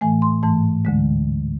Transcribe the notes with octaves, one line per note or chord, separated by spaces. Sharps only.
A2 E3 A3 G#5
C6
G#2 E3 A3 A5
D2 D3 G#3